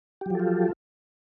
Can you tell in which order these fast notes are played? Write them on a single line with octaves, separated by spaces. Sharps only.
G4 F#3 F3 A4 F4